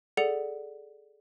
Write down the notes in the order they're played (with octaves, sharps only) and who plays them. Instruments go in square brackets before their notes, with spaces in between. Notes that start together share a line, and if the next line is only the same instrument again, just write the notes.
[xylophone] G#4 A4 D5 F#5 C#7 F7